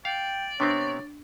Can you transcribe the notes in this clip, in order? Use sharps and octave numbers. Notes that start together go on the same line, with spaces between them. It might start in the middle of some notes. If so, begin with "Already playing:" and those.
D5 F5 G5
C3 B3 C4 D4 C#5